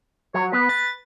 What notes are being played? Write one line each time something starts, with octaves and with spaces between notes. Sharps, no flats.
F#3 C#5
B3 B4
A6